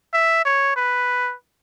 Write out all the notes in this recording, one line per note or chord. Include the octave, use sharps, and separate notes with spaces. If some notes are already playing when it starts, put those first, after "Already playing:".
E5
C#5
B4